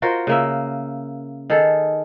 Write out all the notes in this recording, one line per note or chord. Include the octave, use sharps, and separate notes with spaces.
F4 F#4 A#4 C5
C#3 A#3 E5
D#3 G#4 A4